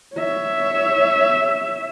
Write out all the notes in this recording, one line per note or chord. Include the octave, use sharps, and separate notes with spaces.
C#5 E5